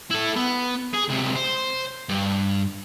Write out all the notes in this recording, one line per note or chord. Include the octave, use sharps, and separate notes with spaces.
E4 A4
B3
G#4
C#2 C3
C5
G2